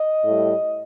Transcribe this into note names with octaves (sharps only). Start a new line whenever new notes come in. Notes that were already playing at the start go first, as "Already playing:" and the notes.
Already playing: D#5
A2 G3